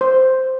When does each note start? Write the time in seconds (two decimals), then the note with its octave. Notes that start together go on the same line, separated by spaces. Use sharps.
0.01 C5